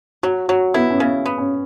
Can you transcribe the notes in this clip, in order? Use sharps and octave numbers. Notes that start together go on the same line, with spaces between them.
F#3 F#4
F#3 F#4
B3 E4
C#4
C#3 B3
B3
C#4